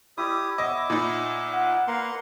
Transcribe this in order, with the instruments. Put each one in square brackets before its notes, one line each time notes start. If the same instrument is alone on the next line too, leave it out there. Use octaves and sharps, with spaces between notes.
[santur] E4 D5 D#5 [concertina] G4 D#6
[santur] B3 C#5 [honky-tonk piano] D#5 [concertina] E5 D6
[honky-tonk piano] A#2 D#4 [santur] D5
[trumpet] F#5
[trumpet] A#3 [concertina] B4 F#5 C6